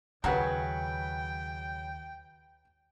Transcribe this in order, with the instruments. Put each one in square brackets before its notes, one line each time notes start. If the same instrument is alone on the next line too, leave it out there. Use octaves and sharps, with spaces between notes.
[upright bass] D#2 [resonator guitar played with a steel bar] C#3 F#3 G#4 [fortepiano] B4 F#5 A#5 [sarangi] G5